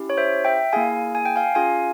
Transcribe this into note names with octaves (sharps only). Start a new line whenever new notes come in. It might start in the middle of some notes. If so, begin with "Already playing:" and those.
Already playing: C#4 E4 G4
C#5
C5 E5
E5 G5
A#3 E4 G#4 F5 G#5
G#5
G5
F5 G#5
C#4 F4 G#4 F5 G#5